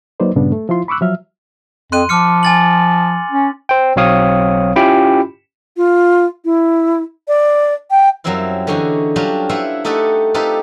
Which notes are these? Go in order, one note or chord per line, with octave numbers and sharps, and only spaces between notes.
F#3 A#3 D#4 B4 C5 D5
G2 A#2 C#3 G3 B3 D4
A3
F3 E4 F4 C6
B5 C#6 D6 E6 F#6
F3 F#3 E5 F6
F2 C6 F#6 D#7
F3 D6 F6 C#7
G#5 A6 F#7
C#4
C5 G5
B1 F#3 C4 C#5 F5 D#6
C#4 E4 F4 G4 G5 B5
F4
E4
D5
G5
F#2 F#3 G3 C4 E4 F4
D3 E3 C#4 D#4 F#4 G#4
F#3 G3 C#4 D4 F4 G4
E4 F4 B4 C5 E5 F#5
A3 D#4 G4 A4 D#5 F#5
C4 D#4 F4 G4 A4 B4